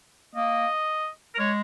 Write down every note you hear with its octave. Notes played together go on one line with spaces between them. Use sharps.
A#3 D#5
A#4
G#3 C#5